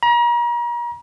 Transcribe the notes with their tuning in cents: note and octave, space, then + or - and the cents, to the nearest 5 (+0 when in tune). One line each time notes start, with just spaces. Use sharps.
A#5 +40